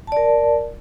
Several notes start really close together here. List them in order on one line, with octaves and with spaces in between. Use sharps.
A5 D5 A#4